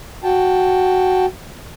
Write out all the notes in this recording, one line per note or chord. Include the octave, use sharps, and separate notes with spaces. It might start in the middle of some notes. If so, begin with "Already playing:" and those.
F#4 G5 A5